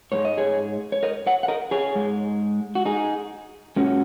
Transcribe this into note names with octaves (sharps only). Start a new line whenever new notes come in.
G#2 G#3 C#5
D#5
G#4 C#5
C#5
A#4 D#5
C#5 F#5
F#5
A#4 D#5
G#4 C#5
G#2 G#3
F#4
D#4 G#4
A#2 G#3 C#4 F#4